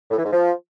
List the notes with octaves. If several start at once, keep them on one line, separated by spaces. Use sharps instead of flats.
A2
E3
G#2
F3